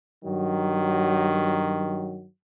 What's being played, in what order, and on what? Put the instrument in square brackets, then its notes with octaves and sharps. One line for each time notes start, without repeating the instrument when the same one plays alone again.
[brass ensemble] G2 D#3 F#3